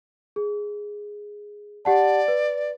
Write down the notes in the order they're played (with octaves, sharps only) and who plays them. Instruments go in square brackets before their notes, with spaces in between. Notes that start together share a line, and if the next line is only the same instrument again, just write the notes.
[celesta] G#4
[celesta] G4 F#5 A5 [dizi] D5
[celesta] B4